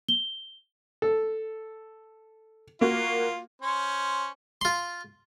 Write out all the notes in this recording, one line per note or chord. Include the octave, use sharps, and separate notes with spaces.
G7
A4
A#3 F4 F#4
C#4 C5
F4 C6